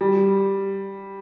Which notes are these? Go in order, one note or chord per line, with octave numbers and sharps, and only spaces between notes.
G3